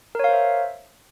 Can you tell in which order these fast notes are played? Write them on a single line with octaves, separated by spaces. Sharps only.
A#4 C#5 F5 C5 E5